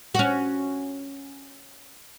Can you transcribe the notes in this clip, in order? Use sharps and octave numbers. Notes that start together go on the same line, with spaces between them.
C#4 F#4